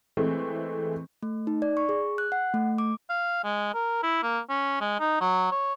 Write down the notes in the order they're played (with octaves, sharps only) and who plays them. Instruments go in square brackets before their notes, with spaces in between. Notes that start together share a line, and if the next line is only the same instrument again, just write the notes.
[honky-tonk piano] E3 G#3 A3 C4
[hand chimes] A3
D#4
D5
C#6
G#4
F#6
F#5
A3
D6
[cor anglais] F5
G#3
A#4
E4
A#3
C#4
G#3
D#4
F#3
C#5